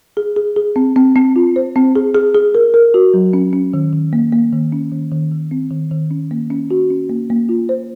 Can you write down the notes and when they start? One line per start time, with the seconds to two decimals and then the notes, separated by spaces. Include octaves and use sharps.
0.17 G#4
0.36 G#4
0.56 G#4
0.76 C4
0.96 C4
1.16 C4
1.36 F4
1.56 C5
1.76 C4
1.96 G#4
2.14 G#4
2.35 G#4
2.55 A#4
2.74 A#4
2.94 F#4
3.14 F#3
3.33 C#4
3.53 C#4
3.74 D#3
3.93 D#3
4.13 A#3
4.33 A#3
4.53 D#3
4.72 C#4
4.92 D#3
5.11 D#3
5.32 D#3
5.51 C4
5.71 D#3
5.91 D#3
6.11 C#4
6.31 A#3
6.50 C#4
6.71 F#4
6.90 C#4
7.09 A#3
7.30 A#3
7.49 F4
7.69 C5